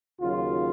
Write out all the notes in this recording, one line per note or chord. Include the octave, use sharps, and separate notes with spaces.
D#2 C#3 F#3 F4